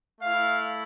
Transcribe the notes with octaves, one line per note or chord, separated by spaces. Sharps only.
A3 E4 F5